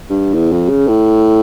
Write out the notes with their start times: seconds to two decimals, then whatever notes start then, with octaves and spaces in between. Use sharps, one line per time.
0.10 G2
0.34 E2
0.52 F2
0.69 C#3
0.88 A2